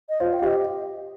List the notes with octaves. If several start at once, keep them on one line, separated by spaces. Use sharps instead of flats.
D#5
F4 C5
G5
F5
G4 D#5